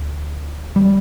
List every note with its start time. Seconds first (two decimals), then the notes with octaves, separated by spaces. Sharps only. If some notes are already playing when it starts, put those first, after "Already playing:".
Already playing: D2
0.76 G3